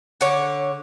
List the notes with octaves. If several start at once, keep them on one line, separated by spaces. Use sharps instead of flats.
D3 C#5